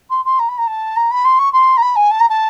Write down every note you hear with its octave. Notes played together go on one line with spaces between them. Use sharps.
C6
C6
A#5
B5
A#5
A5
A#5
B5
C6
C#6
C6
A#5
B5
G#5
A5
A#5
A5